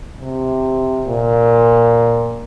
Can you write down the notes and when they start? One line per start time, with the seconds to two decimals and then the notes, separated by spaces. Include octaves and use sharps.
0.20 C3
1.07 A#2